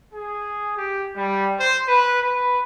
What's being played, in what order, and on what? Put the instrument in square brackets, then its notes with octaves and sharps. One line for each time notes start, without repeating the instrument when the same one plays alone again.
[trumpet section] G#4
G4
G3
C5
B4
B4